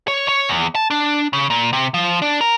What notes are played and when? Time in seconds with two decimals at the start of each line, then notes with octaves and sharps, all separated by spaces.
0.08 C#5
0.28 C#5
0.49 E2
0.75 A5
0.90 D4
1.33 C#3
1.50 A#2
1.73 C3
1.94 F3
2.22 D4
2.41 A#4